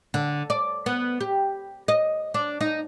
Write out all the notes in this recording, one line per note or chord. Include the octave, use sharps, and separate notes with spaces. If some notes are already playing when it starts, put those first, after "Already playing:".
D3
D5
B3
G4
D#5
D4
D#4